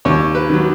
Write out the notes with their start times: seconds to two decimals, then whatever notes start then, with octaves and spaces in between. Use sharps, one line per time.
0.05 D#2 C#5
0.35 B4
0.50 D#3 F#3